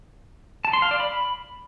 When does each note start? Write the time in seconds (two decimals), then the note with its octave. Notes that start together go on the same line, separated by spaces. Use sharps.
0.65 A5
0.73 C6
0.82 F5
0.91 D5
1.00 B5